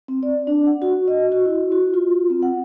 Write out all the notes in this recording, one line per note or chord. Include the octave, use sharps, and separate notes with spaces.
C4
D5
D4
F#5
F#4
D#5
F#4
E4
F#4
F4
C4
F#5